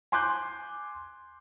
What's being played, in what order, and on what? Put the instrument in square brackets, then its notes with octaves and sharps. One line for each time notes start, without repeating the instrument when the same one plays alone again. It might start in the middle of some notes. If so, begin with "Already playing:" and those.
[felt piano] G#5 C6 D6 F#6 G6